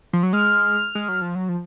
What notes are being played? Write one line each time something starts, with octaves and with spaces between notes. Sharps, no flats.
F3
F#3
G#3 F6
G#3
F#3
F3
F#3
F3